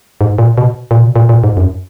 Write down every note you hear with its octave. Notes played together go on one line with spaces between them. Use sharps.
G#2
A#2
B2
A#2
B2
A#2
A#2
G#2
F#2